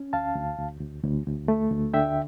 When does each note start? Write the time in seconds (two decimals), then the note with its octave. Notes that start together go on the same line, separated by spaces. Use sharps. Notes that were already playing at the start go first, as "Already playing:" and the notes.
Already playing: C#4
0.13 D2 F5 A5
0.36 D2
0.59 D2
0.81 D2
1.03 D2
1.26 D2
1.48 A3
1.71 D2
1.94 D3 E5 G5